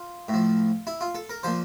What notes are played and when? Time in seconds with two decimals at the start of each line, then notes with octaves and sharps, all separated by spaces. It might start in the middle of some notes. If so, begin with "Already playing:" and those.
Already playing: F4
0.28 A2
0.33 F3
0.87 E4
1.01 F4
1.15 A4
1.29 A#4
1.43 A#2 F3 C5